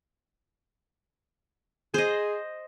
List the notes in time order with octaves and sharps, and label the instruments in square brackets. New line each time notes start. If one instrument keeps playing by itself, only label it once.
[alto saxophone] G#4 [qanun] C5 D#5